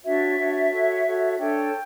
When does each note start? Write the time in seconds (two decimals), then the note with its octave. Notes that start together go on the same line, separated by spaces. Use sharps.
0.04 D4 F#4 C#5 E5
0.38 D4 F#4 C#5
0.70 F#4 A4 C#5
1.05 F#4 A4 C#5
1.38 D4 A4 C#5 G5